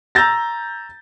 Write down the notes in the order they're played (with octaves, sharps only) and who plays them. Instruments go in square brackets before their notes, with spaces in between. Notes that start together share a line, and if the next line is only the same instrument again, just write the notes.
[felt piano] A#5 E6 G6 A6 A#6